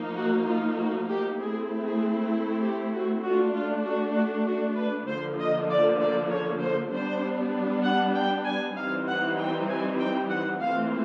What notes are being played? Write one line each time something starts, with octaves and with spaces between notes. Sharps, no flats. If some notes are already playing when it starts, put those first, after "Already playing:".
Already playing: F3 A#3 D#4
F#4
F4
F#4
G4
A3 C4 E4 G#4
G#4
G4
F#4
A3 D4 F4 F#4
F4
F#4
F#4
F#4
B4
D3 F3 A#3 C5
D#5
D5
D5
C#5
C5
G3 B3 D4 C5
F#5
G5
G#5
E3 G3 C4 D#4 F5
F#5
G5
G#5
G5
F#5
E3 A3 C4 F4 F5